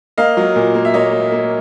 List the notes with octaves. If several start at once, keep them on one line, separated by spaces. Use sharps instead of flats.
A#3 D#5 F5
F#3
A#2
A#3
E5
A#3 C#5 D#5
A#3
A#3